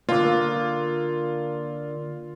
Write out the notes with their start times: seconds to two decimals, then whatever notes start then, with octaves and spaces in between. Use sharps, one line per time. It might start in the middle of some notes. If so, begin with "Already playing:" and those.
0.09 D3 A#3 F4